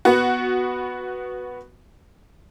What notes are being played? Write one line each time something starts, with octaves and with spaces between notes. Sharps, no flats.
B3 F#4